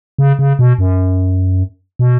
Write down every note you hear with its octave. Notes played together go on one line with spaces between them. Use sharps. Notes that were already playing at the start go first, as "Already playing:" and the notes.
C#3
C#3
B2
F#2
B2